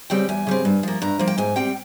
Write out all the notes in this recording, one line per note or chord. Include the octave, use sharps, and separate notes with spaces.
C#3 G3 C4 G5
E2 G#5
C#3 G3 C4
G2
F3 A#3
G2 A#5
F3 A#3
G5
G#2 G#5
G3 C4 G5